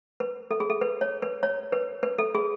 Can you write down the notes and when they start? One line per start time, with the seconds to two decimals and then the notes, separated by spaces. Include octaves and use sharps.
0.20 B4
0.51 A4
0.60 G#4
0.70 A4
0.81 B4
1.01 C#5
1.22 B4
1.43 C#5
1.73 B4
2.03 B4
2.18 A4
2.35 G#4